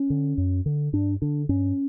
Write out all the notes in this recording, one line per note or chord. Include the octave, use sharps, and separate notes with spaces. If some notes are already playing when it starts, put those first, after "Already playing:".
Already playing: C#4
D3
F#2
D3
G2 D4
D3 D4
G2 C#4